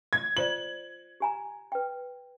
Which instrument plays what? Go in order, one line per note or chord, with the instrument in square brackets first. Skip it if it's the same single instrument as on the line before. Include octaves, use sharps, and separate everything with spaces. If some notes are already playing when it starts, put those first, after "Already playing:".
[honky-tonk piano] G#6
[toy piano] F4 C5 D5 [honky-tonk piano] F#7
[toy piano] G4 G#5 A#5
B4 G5